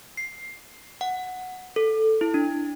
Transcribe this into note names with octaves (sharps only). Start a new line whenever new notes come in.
C7
F#5
A4
E4
D4